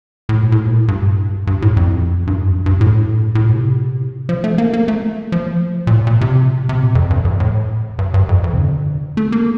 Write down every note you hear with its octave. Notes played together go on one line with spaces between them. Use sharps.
A2
A#2
A2
A#2
A2
G2
G2
A2
F2
G2
F2
G2
F2
G2
A2
A2
A#2
C3
F3
A3
A#3
A#3
A3
F3
A#2
A2
A#2
C3
C3
A#2
F2
G2
F2
A2
G2
G2
F2
F2
C3
D3
A3
A#3